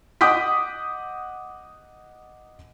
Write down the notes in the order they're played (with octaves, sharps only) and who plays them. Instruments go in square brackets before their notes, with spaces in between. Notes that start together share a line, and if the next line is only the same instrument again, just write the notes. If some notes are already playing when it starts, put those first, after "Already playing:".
[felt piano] D#5 F#5 D6 D#6 G6 B6